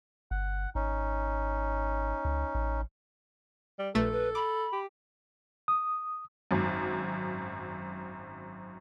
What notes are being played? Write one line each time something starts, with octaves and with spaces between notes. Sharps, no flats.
G1 F#5
G#1 C#4 D#4
C#2
A1
G3
A#1 A3 A4 B4 A6
B4
B5 D6
G4
D#6
G#1 F#2